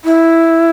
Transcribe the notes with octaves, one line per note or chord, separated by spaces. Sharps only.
E4